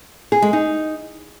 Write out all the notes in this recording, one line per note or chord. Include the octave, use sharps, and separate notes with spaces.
G#4
G#3
D#4